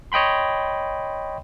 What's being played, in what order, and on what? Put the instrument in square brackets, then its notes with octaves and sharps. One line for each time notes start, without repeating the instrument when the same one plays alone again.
[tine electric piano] C#5 D#5 G5 B5 C6